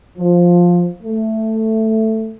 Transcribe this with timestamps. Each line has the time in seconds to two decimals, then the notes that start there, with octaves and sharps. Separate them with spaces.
0.18 F3
1.03 A3